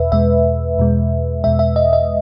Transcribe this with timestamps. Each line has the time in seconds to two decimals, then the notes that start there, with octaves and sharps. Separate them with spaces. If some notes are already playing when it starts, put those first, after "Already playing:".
Already playing: E2 B2 B4 E5
0.12 E2 B2 G#3 E5
0.77 E2 B2 G#3
1.44 E2 B2 G#3 E5
1.59 E5
1.76 D#5
1.93 D#5